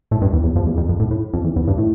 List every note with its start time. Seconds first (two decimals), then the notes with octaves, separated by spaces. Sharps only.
0.11 A2
0.22 G2
0.33 E2
0.44 E2
0.56 F2
0.67 E2
0.77 F2
0.89 F2
1.00 A2
1.11 A2
1.34 F2
1.45 E2
1.56 E2
1.68 G2
1.78 A2